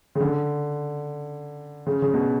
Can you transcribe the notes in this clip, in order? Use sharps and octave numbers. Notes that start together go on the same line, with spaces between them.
C#3
D3
C#3
C#3
B2